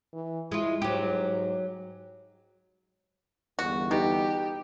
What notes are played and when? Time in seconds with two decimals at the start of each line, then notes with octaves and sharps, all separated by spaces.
0.13 E3
0.52 G#3 E4 F4
0.82 G#2 F#3 G4
3.59 G1 E2 F#4
3.91 B2 D#4 G4